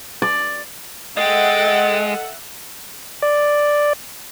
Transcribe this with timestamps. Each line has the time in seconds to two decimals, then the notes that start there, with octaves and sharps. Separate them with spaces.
0.22 D5
1.17 G#3 A4 D#5 E5 F#5 G5 A6
3.22 D5